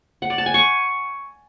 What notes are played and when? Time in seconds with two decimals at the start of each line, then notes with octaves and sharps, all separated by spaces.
0.22 F#5
0.30 D5
0.38 A5
0.46 G#5
0.54 C#6